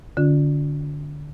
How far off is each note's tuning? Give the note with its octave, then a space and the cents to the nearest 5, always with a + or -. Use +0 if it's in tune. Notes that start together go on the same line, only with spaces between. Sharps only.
D3 +0 C#4 +40 F4 +30